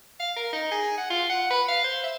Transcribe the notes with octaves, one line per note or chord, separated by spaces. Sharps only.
F5
A#4
D#4
G#4
F#5
F4
F#5
B4
F5
C5
E5